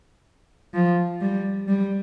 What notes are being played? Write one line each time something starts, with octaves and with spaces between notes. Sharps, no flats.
F3
G3
G3